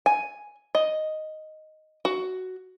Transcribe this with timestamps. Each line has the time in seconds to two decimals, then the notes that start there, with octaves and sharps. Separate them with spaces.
0.06 G#5
0.75 D#5
2.05 F#4